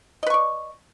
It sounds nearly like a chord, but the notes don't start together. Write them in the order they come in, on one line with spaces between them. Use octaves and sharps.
D#5 B4 C#6 D5